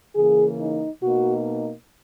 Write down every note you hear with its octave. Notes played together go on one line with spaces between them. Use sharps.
C#3 E3 A#3 G#4
D#4
B2 A#3 D#4 F#4